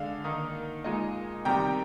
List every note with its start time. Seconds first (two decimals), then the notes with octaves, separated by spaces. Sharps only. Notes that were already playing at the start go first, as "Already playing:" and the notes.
Already playing: D3 G#3 D4 F5
0.24 D#3 A#3 D#4
0.84 A#2 G#3 D#4 D#5
1.45 C3 D#3 G3 G5 A#5